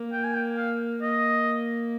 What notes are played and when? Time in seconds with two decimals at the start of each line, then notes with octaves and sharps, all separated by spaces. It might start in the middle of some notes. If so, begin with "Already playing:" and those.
Already playing: A#3
0.13 G5
0.24 G#5
0.35 G5
0.57 F5
1.02 A#3 D#5